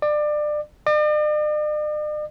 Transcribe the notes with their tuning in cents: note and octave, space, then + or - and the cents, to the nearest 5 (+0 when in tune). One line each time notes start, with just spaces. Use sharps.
D5 +25
D5 +45